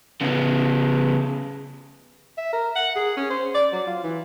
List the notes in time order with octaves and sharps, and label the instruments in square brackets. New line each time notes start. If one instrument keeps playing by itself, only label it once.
[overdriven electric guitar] C#3 B3
[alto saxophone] E5
A#4
F#5
G#4
C#4
C5
D5
F#3
F4
E3